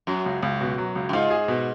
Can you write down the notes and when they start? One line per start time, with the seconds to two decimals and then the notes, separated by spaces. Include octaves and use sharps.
0.07 F#2 F#3
0.26 C#2
0.43 C#2
0.61 B2
0.78 F#3
0.96 C#2
1.09 F#2
1.13 G#2 F4
1.30 G#4
1.48 B2